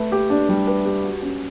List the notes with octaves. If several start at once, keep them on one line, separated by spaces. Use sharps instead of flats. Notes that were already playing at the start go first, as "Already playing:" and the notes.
Already playing: A3 B4
G4
D4
G3
B4
G4
F#4
C#4